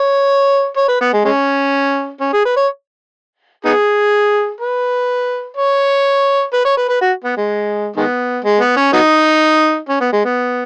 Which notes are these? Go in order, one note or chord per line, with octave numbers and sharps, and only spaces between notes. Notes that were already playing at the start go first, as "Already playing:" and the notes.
Already playing: C#5
C#5
B4
B3
G#3
G#3 C#4
C#4
G#4
B4
C#5
B3 D#4 G#4
B4
C#5
B4
C#5
B4
B4
F#4
B3
G#3
D#3 G#3 B3
G#3
B3
C#4
F#3 B3 D#4
C#4
B3
G#3
B3